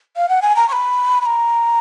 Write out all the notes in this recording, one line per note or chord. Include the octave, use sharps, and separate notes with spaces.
F5
F#5
G#5
A#5
C#6
B5
B5
A#5